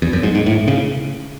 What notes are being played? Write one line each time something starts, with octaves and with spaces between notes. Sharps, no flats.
E2
F#2
G#2
G#2
A2
C#3